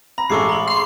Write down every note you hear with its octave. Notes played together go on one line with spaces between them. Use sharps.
A#5 B5
A1 G#3 A4 C#6 D6 C7
A#5 F#7
C6